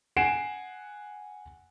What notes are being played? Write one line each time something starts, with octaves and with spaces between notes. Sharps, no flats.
F#5 G#5 C7 D7 E7